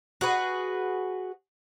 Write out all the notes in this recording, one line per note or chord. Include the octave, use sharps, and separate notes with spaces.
F#4 G#4 B4